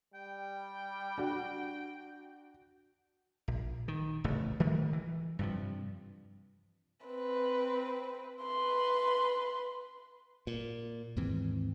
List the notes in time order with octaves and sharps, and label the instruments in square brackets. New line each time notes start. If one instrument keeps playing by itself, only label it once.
[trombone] G3 [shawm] G5
[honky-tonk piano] D4 F#4
[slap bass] A#1
D#3
D1 A1 C#3 A3
D#3 F3 A3
E3
G2 C3 F3
[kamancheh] C4 B4
B4 C6
[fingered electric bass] A#2
D#2 G#2 E3 C4